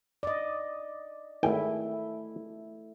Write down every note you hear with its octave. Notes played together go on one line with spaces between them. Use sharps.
D5 D#5
G#1 A3 E4 G5 G#5